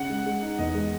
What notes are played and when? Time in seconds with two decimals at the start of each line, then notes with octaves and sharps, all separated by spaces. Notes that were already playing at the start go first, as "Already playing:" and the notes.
Already playing: C#3 F#5
0.09 G#3
0.26 G#3
0.42 D#4
0.58 E2 D#5
0.75 G#3